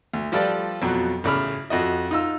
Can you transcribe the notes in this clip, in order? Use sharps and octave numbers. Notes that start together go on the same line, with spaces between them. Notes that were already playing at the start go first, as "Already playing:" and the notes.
D2
F3 G3 F4 A4 B4 D5
F2 B2 F#3
A1 C#3 B5 F6
F2 F#4 D#5
D#4 F4 E6